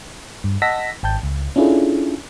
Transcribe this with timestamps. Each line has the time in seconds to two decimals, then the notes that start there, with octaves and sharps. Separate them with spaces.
0.44 G2
0.62 D#5 F#5 A5 E6 A#6 B6
1.03 G#1 G5 A5 G6
1.23 C#2
1.56 C#4 D4 E4 F4 G#4 A4